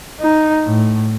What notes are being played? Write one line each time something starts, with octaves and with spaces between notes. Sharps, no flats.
D#4
A2